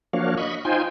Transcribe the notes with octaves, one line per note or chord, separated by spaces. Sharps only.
F3 A#3 D4 F#4 C#5 F5
D#5 B5 C#6
D#4 F4 C5 G5 G#5